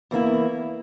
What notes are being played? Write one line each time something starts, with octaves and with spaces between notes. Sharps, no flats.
E2 E3 A#3 E4